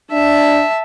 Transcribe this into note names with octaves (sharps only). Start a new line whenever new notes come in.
D4 E5 A5